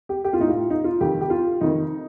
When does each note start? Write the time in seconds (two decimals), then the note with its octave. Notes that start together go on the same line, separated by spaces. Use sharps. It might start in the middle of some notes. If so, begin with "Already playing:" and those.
0.09 G4
0.24 G4
0.33 F4
0.39 A2 D#4
0.49 F4
0.70 D#4
0.84 F4
1.01 F2 D#3 G4
1.21 G4
1.30 F4
1.61 F2 D#3 D#4